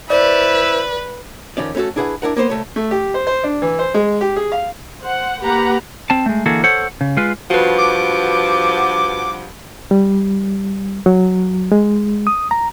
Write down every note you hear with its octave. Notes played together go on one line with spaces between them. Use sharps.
E4 B4 C5 D5 E6
F2 D#3 C#4 D5
A3 C#4 D#4 F#4 A4
D4 E4 G#4 B4 F5 F#5
D4 E4 A#4 F#5
A#3 B3 C5 C6
C2 A3 C#5
A3
G4
C5
C5
D4
E3
C5
G#3
G4
G#4
F5
C5 F#5
A#3 G4 B4 F#5 A#5
C4 A5
G#3 A3
D3 E3 A#3 F#4 G#4 A4
A4 C5 C#5 F#5
C#3
G#3 F4 B4
G2 F3 F#4 B4 F#5
D6
G3
F#3
G#3
D#6
A#5